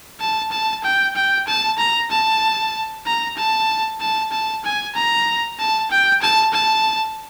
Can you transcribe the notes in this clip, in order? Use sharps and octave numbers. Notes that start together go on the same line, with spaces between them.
A5
A5
G5
G5
A5
A#5
A5
A#5
A5
A5
A5
G#5
A#5
A5
G5
A5
A5